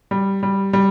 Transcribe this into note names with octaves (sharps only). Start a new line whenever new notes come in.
G3
G3
G3